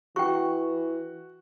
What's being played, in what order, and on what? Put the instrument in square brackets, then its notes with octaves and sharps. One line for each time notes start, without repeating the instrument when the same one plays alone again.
[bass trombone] E3 [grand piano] F#4 [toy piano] G5 C#6